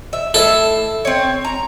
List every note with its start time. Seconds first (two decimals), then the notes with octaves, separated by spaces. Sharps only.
0.13 E5
0.34 A2 A4 E5
1.05 C4 C#5
1.45 A#5